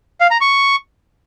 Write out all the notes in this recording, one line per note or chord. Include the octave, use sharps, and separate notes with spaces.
F5
A#5
C#6